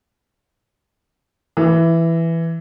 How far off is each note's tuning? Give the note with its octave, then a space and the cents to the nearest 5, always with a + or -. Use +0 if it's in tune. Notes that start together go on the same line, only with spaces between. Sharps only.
E3 +5